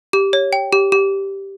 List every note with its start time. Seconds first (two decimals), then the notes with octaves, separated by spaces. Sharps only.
0.13 G4
0.33 C#5
0.53 G5
0.73 G4
0.92 G4